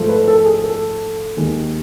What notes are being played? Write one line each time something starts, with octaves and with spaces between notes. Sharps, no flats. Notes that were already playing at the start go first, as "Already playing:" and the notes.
Already playing: G#2 F3 A3
B4
A4
G#4
A4
D#2 D#3 G#3